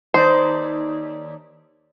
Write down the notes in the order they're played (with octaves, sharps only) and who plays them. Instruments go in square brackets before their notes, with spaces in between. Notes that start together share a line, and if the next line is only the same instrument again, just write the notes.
[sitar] D#2 D#4 D5 [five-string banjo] C5